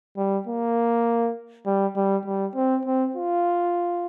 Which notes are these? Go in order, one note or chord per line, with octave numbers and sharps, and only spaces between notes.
G3
A#3
G3
G3
G3
C4
C4
F4